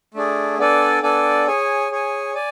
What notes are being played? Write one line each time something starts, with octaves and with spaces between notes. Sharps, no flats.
A3 D4 G#4
B3 D4 A4 D5 G#5
B3 D4 A4 D5 G#5
G#4 C#5 G#5
G#4 C#5 G#5
D5 G#5